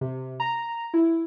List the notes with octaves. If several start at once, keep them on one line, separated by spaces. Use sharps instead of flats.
C3
A#5
E4